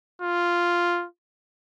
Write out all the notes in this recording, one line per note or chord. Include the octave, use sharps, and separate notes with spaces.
F4